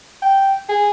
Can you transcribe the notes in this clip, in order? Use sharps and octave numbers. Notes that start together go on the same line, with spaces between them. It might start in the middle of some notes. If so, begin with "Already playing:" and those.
G5
G#4